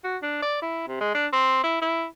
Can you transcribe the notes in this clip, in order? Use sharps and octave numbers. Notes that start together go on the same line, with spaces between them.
F#4
D4
D5
E4
C3
G#3
D4
C4
E4
E4